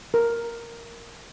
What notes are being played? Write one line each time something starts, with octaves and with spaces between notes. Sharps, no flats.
A#4